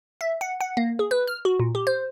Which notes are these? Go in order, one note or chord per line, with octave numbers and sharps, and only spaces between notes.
E5
F#5
F#5
A#3
G#4
B4
F6
F#4
A#2
G4
C5